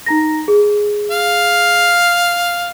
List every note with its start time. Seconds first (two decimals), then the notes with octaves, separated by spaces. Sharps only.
0.06 D#4 A#5 A#6
0.48 G#4
1.11 F5